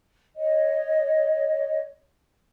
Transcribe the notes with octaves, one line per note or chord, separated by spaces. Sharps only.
C#5 D#5